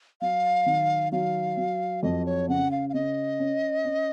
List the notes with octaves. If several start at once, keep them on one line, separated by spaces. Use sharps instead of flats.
F#3 F5
D#3
F#3 F5
F#3
F2 D#5
C#5
C#3 F#5
F5
F5
C#3 D#5
C#4
C#4